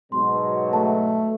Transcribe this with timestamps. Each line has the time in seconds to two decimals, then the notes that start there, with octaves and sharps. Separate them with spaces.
0.12 G#2 B2 F#3 C6
0.73 A3 A5